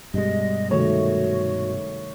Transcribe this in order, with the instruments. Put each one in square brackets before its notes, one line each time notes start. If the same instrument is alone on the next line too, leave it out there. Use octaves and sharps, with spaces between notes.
[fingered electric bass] G2 B2 G#3 [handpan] G3 [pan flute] D#5
[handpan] C3 D#3 A3 [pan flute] F#4 [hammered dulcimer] C#5